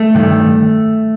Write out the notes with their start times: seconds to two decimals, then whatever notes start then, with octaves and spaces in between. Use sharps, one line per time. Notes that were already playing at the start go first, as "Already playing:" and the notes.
Already playing: A3
0.14 G2 D#3